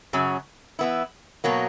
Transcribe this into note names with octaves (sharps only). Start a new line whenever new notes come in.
F#2 C#3 F#3
E3 B3 E4
B2 F#3 A#3